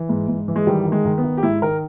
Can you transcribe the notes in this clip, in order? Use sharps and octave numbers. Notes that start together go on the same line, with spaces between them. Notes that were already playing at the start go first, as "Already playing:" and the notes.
Already playing: E3
G#2
G#2
E3
G#3
D#3 G3
D#3
G#3
D#3
B3
D#3
G4
G#2 E4
D#3 A#4